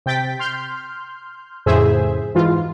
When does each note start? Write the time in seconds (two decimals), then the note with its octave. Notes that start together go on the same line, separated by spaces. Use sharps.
0.06 C3 G5 A6 B6
0.39 C6 F6 G6
1.66 F2 A2 C#3 G#4 C5 E5
2.35 G#2 E3 F4